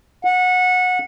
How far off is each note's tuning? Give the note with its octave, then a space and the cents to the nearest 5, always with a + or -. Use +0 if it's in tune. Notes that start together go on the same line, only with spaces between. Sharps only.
F#5 -20